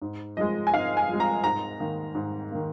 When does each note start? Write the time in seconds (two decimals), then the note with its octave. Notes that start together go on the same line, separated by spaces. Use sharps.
0.02 G#2
0.37 F3 G#3 D#5
0.67 G#5
0.73 G#2 F5
0.97 G#5
1.09 F3 G#3
1.20 A#5
1.44 G#2 A#5
1.80 D#3 A#3
2.15 G#2
2.51 D#3 A#3